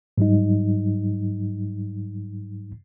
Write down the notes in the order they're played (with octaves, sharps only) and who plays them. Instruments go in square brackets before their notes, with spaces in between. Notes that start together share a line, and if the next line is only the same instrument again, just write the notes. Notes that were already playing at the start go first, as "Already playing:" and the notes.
[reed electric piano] G#2 F#3 G3 D#4